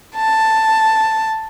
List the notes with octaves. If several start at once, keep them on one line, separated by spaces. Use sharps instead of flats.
A5